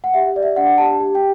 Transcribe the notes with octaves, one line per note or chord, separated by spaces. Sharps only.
F#5
G4 E5
D5
E5
D4 F#5
G4 A5
G4
G5